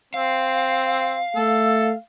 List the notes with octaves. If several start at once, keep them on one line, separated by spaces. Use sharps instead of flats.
C4 F5
A3 A4